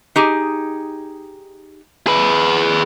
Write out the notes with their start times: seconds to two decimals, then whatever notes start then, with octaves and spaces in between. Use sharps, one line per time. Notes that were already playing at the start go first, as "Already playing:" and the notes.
0.16 D#4 G4 G#4
2.07 G#4 B4